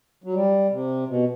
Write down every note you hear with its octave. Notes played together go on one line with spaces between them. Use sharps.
F#3
G3
C3
B2